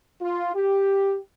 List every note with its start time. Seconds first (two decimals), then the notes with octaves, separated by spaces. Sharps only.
0.21 F4
0.55 G4